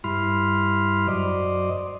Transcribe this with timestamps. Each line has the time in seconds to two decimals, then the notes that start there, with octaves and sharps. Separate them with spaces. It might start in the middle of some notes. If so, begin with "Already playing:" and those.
0.04 G2 E4 B5 C6 F6
1.08 F#2 C5 D5 D#5